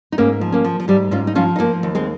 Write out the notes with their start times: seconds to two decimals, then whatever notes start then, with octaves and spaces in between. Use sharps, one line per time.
0.12 D#4
0.18 G#2 A#3 C#4
0.41 F3
0.52 A#3 C#4
0.64 F3
0.80 F3
0.88 G#2 G3
1.11 G#2 C#4 F4
1.27 D#4
1.35 F3 C#4 F4
1.56 D#4
1.59 F3 A#3 C#4
1.83 D#2
1.95 G#3 C4